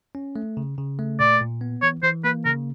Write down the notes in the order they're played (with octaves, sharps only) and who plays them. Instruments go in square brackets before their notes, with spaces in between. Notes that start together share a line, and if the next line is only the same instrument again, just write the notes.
[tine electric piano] C#4
A3
C#3
C#3
A3
[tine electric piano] A#2 [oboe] D5
[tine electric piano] A#2
B3
[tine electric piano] E3 [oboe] C#5
[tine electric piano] E3 [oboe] C5
[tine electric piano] A#3 [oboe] B4
[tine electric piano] C#3 [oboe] A#4